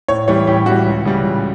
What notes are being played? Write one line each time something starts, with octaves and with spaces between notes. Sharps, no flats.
A2 C#5
E3 G3 C#5
A2 G4
E3 G3 F#4
C#2
C#3 E3 G3
C#2